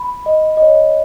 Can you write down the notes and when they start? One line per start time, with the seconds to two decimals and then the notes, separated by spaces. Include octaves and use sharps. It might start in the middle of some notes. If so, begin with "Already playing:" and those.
Already playing: B5
0.26 D#5
0.57 D#5
0.62 C#5